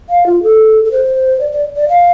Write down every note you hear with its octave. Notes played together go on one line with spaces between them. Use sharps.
F5
F4
A4
A4
C5
D5
D5
D5
F5